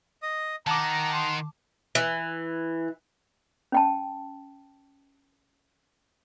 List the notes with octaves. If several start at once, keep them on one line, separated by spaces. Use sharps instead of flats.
D#5 D#6
D#3 F#5 A5 A#5 D6
C6
E3
C#4 G5 A5